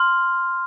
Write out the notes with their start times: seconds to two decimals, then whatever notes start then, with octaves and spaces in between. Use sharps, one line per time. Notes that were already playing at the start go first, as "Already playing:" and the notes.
Already playing: C6 F6